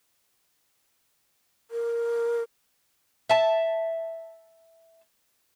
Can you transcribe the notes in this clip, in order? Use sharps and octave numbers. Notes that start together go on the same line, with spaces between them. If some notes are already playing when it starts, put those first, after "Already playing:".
A#4
E5 A5